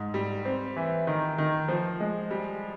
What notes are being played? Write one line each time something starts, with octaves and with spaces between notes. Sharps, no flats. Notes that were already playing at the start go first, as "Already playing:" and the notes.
Already playing: G#2
G3
C4
E3
D#3
D#3
F3
G#3
G3